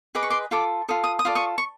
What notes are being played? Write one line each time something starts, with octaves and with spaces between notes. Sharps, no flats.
G#4 B4 D#5 D6
C#6
C6 D6
F4 A4 D6
F4 A4 D#6
D#6
D#6
F4 A4 D5
C#6 D#6
C#6